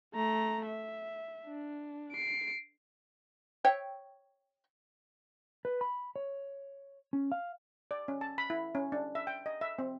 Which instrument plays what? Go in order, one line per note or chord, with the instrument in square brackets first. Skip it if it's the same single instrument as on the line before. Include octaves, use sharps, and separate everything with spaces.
[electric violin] A3 A#5
E5
D4
C7 D7
[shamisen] C#5 E5 G5
[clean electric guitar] B4
B5
C#5
C#4
F5
[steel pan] D5
C#4
A5
B5
E4
C#4
D4
E5
G5
D#5
E5
C4